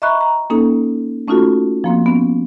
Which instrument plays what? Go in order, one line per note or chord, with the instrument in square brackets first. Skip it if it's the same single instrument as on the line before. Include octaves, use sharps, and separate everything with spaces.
[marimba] D#5 E5 A#5 B5 C#6 F#6
A#5
A#3 C#4 D#4 A4
A3 C#4 D#4 F4 F#4 A4
F3 A#3 C4
B3 C#4